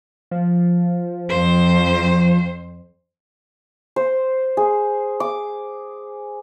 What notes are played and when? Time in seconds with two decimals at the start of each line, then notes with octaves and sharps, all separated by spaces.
0.31 F3
1.30 F2 C5
3.96 C5
4.57 G#4
5.20 D6